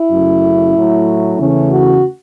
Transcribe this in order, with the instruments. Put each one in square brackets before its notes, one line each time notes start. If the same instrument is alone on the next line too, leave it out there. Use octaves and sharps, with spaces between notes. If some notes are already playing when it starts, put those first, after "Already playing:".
Already playing: [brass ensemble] E4
F#2 C#3 A3
A2 F#3 A3
E2 C#3 E3 A3 C#4
F#4